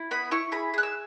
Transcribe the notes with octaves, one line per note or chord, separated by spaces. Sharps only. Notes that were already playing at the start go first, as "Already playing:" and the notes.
Already playing: E4
B3 B5
E4 C#6
G#4 B5
G#4 F#6
E6